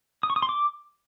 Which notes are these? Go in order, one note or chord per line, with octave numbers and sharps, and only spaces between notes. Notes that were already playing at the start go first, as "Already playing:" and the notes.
D#6
C#6
D#6
C6
D6